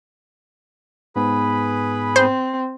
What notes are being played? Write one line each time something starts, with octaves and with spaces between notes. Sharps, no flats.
G#2 B3 G#4 B4 B5
C4 C5